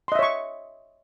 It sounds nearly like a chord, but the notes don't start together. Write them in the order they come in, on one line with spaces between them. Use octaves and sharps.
C6 D#5 E5 C#5 C#6